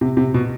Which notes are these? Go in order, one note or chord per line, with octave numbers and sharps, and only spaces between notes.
C3
C3
B2